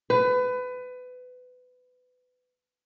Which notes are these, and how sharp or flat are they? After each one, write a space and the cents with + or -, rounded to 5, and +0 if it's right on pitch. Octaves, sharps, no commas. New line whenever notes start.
B4 +25